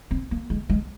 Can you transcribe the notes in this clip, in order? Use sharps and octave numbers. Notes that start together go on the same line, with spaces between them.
C4
A#3
G#3
G#3